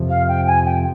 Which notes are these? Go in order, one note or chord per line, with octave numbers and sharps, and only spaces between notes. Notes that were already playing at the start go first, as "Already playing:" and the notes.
Already playing: F2 C3 F3
F5
G5
G#5
G5